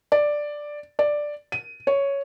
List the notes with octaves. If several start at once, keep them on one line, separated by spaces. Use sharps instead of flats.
D5
D5
D#7
C#5